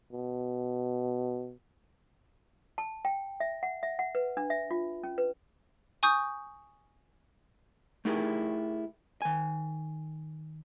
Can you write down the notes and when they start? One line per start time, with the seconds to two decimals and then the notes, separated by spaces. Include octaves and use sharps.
0.12 B2
2.78 A5
3.05 G5
3.40 E5
3.63 F#5
3.83 E5
3.99 F#5
4.15 B4
4.37 D4
4.50 E5
4.71 F4
5.03 C#4
5.18 B4
6.03 G#5 C#6 D#6 G6
8.05 A3 D#4 E4 G4 G#4 A#4
9.22 D#3 G#5